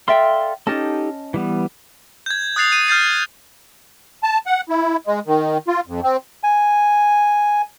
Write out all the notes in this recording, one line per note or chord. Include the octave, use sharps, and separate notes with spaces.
A4 D5 E5 F5 G5 C6
C#4 D#4 G4 A4 D#5 A5
E3 G3 B3
G6 G#6
D#6 F#6 A6 C7 F7
D#7
F6 G6 A6 C7
A5
F#5
E4
G#3
D#3
F4
F2
C4
G#5